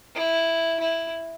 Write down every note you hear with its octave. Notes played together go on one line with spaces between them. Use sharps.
E4
E4